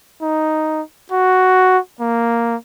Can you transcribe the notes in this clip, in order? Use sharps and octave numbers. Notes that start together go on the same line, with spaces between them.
D#4
F#4
A#3